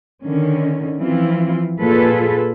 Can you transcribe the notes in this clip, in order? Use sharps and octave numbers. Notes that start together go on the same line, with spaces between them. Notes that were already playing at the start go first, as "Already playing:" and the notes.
D3 D#3 C#4
E3 F3 C4 E4 F4
A#2 F4 G#4 A4 B4